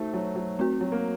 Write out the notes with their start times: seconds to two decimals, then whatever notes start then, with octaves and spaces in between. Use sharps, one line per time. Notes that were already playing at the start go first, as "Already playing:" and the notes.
Already playing: A3 D#4 F#4 C5
0.14 F#3
0.36 F#3
0.59 A3 C4 F#4
0.81 F#3
0.92 A#3